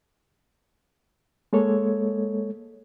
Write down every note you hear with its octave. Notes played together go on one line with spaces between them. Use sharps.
G#3 A#3 A4 C#5